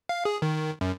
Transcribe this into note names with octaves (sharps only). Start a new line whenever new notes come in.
F5
G#4
D#3
F#2